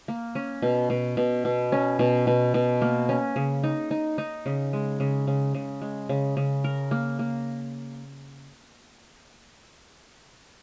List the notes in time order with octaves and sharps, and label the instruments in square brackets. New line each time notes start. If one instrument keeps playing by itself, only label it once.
[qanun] A#3
C#4
B2
B2
B2
B2
C#4
B2
B2
B2
A#3
C#4
C#3
D#4
D#4
D#4
C#3
G#3
C#3
C#3
C#3
G#3
C#3
C#3
A#4
A#3
A#3